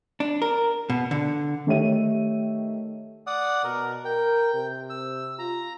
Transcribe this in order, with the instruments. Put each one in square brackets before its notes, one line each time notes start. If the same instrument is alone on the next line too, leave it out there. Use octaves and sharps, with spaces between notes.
[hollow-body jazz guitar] D4
A#4
B2
D3
[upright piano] D#3 A3 G4 C#5 E5 D#7
[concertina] D5 F#5 D#6
[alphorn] B2 [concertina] A#4
[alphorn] A#4 [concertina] G5
[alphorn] C3
[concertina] E6
[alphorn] F4 [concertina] A#5